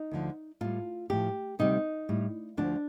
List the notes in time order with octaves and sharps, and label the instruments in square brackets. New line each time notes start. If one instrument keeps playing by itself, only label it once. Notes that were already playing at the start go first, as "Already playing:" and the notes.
Already playing: [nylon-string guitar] D#4
D2 D3 F3
A2 G3 F4
A2 F3 G4
D2 C3 G3 D#4
A2 G3
D2 D3 F3 D4